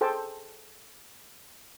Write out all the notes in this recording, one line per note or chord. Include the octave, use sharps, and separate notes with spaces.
G#4 A4 C5 G5 A5